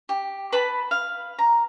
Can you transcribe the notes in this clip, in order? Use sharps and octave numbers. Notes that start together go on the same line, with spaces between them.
G4
B4 A5 B5
F5
A#5